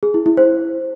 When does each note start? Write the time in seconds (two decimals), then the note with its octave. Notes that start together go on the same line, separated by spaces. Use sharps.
0.03 G#4
0.14 E4
0.26 E4
0.37 C5